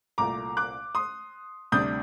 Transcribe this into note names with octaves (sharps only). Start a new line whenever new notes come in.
C2 A#2 A3 A#5 D6
D6 F#6
C6 D#6
D2 C3 G3 D4 D#6 G6